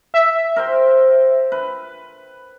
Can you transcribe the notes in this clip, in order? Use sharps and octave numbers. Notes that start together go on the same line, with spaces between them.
E5
A#4 C5 G5
B4